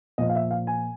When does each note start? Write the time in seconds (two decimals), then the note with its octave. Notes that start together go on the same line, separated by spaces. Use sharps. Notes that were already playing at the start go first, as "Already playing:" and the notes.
0.18 A#2 F3 D#5
0.30 F5
0.35 E5
0.51 F5
0.67 G#5